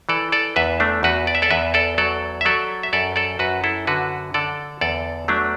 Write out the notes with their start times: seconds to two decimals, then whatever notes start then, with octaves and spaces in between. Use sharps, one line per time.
0.09 E3 A4 D5
0.32 A4 D5
0.56 E2 B4 E5
0.80 A3 D4
1.03 E2 F#4 B4
1.27 D5
1.35 E5
1.42 A4 D5
1.50 E2 B4 E5
1.74 A4 D5
1.98 F#3 A4 D5
2.41 E5
2.45 F#3 A4 D5
2.83 E5
2.93 F#2 A4 D5
3.16 A4 D5
3.39 F#2 F#4 B4
3.64 E4 A4
3.87 D3 F#4 B4
4.34 D3 A4 D5
4.81 E2 A4 D5
5.28 F#3 A3 D4